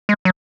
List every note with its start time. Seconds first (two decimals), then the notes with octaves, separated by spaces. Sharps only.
0.09 G#3
0.25 F#3